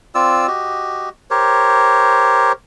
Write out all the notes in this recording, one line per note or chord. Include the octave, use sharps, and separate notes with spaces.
C4 F4 D5 E6
F#4 G4 D#5
G4 A#4 C5 C#5